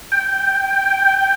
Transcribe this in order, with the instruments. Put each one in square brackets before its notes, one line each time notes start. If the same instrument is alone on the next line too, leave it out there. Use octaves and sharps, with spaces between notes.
[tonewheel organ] G5